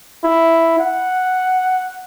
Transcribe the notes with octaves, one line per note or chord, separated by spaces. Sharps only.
E4
F#5